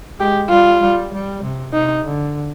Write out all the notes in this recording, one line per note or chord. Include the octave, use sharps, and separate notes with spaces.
G#3 G4
G3 F4
G3
G3
C3
C3 D#4
D3